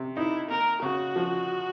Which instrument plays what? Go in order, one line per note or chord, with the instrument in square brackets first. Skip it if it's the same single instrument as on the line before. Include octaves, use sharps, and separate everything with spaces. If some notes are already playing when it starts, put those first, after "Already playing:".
Already playing: [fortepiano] C3
[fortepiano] D#4 [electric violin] E4
[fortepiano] A#3 [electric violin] A#4
[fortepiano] C#3 [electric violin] F#4
[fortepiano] F3